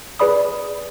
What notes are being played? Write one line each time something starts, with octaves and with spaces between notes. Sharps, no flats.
G#4 B4 D5 B5 D#6